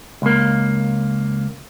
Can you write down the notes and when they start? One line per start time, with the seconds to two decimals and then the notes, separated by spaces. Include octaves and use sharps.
0.22 C#2 A#3